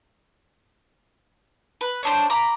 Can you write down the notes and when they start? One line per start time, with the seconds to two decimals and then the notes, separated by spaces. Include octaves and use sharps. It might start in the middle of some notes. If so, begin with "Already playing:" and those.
1.81 B4
2.03 C#4 D4 C5
2.30 A#5 B5 D6